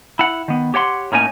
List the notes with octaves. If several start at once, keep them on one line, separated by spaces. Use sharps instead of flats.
E4 F#5
D#3 B3
G4 C#5 F#5 C6
A2 A#3 C#4 D#4 G#5